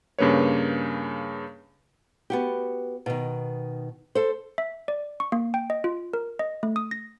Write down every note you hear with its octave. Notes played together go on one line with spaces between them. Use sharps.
G2 C#3 A#3 B4 C#5
B3 F#4 G4
B2 D#3
A4 C5
E5
D5
C#6
A#3
G5
D#5
F4
A#4
D#5
A3
D#6
A#6